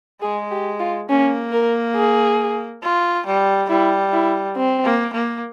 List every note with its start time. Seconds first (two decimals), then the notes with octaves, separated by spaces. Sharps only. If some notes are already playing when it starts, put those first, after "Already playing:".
0.22 G#3 G#4
0.51 G4
0.79 F4
1.09 A#3 C#4
1.52 A#4
1.96 G#4
2.83 F4
3.26 G3
3.69 G3 E4
4.13 E4
4.57 C4
4.84 A#3
5.13 A#3